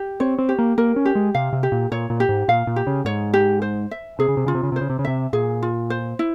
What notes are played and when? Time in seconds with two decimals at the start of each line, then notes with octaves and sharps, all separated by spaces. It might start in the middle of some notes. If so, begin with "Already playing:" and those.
Already playing: G4
0.20 C4 C#5
0.38 C4
0.49 G4
0.59 A#3
0.78 A#3 A#4
0.96 C#4
1.05 G4
1.15 G#3
1.35 C3 F5
1.53 C3
1.63 G4
1.72 A#2
1.92 A#2 C#5
2.10 A#2
2.20 G4
2.29 G#2
2.48 A#2 F5
2.67 A#2
2.76 G4
2.87 C#3
3.05 G#2 C#5
3.34 G4
3.62 C5
3.91 E5
4.19 C3 G#4
4.29 C#3
4.37 C3
4.46 C#3 F4
4.55 C3
4.63 C#3
4.72 C3
4.76 C5
4.81 C#3
4.90 C3
4.99 C#3
5.05 C3 E5
5.33 A#2 G#4
5.63 F4
5.90 C5
6.19 E4